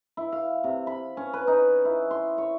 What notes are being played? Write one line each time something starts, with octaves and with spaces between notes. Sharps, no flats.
E4
F5
C3
B5
C#4
B4
D#4
E4
C6
C#5